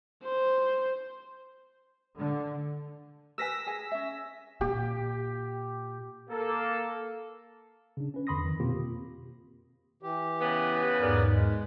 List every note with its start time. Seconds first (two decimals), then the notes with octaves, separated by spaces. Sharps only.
0.23 C5
2.16 D3
3.38 A#4 B4 G#5 E6 A#6 B6
3.66 G#4 G#5
3.92 C#4 E5
4.61 A#2 G4
6.30 A#3 A4
7.97 C#3 D4
8.14 C#4 B4
8.27 E2 D3 B5 C6 D#6 A#6
8.44 F2 D#3
8.60 B2 A#3 C4 F4 G4
10.03 E3 G4
10.41 C#3 B3 B4
11.01 E2 G#2 G#4 A#4 D5
11.33 G#3